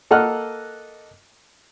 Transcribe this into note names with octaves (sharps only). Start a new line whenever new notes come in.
A#3 A4 D#5 F#5 F6 F#6